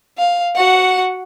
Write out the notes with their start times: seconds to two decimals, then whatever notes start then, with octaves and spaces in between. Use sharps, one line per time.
0.18 F5
0.56 F#4 F#5